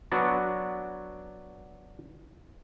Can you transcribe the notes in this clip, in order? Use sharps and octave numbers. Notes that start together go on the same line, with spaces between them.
F#3 B3 D4 F#4